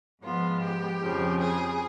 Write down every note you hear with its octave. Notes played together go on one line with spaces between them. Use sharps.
G#2 F3 G#3 B3 F4
G4
F2 C#3 F3
G#4